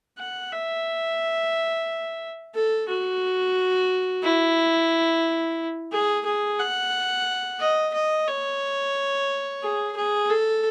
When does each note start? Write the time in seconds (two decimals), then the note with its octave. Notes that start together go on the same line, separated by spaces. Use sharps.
0.18 F#5
0.52 E5
2.54 A4
2.88 F#4
4.23 E4
5.92 G#4
6.25 G#4
6.59 F#5
7.60 D#5
7.94 D#5
8.27 C#5
9.63 G#4
9.96 G#4
10.30 A4